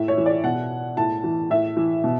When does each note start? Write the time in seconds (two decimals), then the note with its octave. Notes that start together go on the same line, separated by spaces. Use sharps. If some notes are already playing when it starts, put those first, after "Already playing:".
Already playing: A2 E5
0.08 C#5
0.18 E3
0.26 D5
0.44 B2 F#5
0.97 A2 A5
1.24 E3
1.50 A2 E5
1.77 E3
2.04 B2